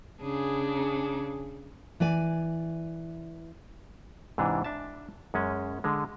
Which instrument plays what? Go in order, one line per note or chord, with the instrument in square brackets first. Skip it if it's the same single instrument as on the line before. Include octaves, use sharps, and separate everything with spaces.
[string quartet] C#3 D4 [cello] G#4
[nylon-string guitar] E3 D5 G#5
[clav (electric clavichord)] G#2 C3 E3 D4
D4 E5 A5
F#2 G#3 C#4
D3 G#3